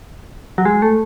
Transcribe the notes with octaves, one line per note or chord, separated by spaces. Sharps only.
F#3
G#3
A3